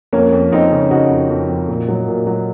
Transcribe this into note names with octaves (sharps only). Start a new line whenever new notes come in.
F2 A#3 C#4
F2
F2 C4 D#4
C#3
C#3 D#4 F#4
F2
F2
F2
A#2
F#3
A#2
F#3